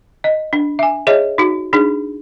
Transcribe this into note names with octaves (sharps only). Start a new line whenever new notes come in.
D#5
D4
E5 G#5
G#4 C#5 D#5 E5
D#4 F#4
D4 D#4 G#4